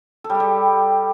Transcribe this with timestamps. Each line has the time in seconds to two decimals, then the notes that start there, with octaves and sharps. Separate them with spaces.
0.24 A4
0.30 G3
0.35 G4
0.40 G3